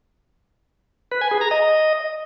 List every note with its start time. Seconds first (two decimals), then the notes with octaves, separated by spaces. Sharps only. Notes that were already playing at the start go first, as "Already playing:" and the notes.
1.12 B4
1.21 G#5
1.31 G#4
1.41 A#5
1.51 D#5